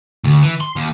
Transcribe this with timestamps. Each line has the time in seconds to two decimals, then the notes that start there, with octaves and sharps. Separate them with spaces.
0.24 D2
0.43 E3
0.61 C6
0.76 D#2